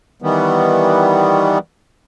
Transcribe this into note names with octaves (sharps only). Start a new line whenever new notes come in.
D#3 E3 G3 B3